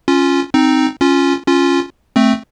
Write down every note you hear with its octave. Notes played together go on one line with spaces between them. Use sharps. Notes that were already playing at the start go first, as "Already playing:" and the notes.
C#4 F4
C4 D#4
C#4 F4
C#4 F4
A3 C4